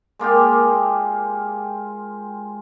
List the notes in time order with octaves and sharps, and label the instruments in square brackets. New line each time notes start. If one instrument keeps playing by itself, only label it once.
[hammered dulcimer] G#3 A#3 F4 G4